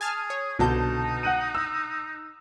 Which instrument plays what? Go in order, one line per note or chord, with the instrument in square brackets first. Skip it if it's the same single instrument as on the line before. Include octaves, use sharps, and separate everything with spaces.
[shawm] G#4 [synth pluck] G#5 A5 F6
[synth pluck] C#5
[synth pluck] C2 D3 G6 [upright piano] B2 A5 [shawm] D#4
[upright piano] F#5 F#6 D#7
E6